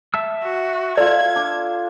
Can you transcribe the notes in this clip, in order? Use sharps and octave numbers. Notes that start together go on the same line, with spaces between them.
E5 A5 E6
F#4
F4 A4 D5 G#6
D4